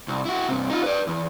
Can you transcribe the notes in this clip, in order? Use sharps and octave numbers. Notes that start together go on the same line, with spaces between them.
C2
E4 F#4
G2 C3
D#4 F4
B4 D5
E2